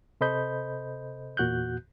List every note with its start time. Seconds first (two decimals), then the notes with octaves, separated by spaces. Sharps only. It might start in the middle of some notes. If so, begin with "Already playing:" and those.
0.21 C3 A4 C5 D#5 B5 G6
1.37 E2 A#2 F#4 F#6 G6